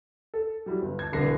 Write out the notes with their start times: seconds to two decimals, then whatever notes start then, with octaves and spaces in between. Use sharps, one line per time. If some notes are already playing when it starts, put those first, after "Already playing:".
0.34 A4
0.66 F#3 G3 E4
0.82 G1
0.99 A5 G#6
1.13 E1 C2 D3 B4 A#6 C7